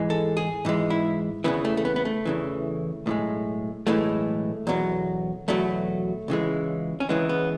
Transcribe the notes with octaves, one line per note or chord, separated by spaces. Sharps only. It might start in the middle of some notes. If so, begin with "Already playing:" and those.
Already playing: G#2 E3 G#3
A4
G#4
G#2 E3 G#3
E4
E2 C#3 E3 B3
A3
A3
B3
B3
A3
E2 C#3 E3
B1 A2 E3 G#3
B1 A2 E3 G#3 A3
E2 B2 F#3
E2 B2 F#3 A3
C#2 C#3 E3 G#3
C#4
C#2 C#3 E3 G#3 B3
B3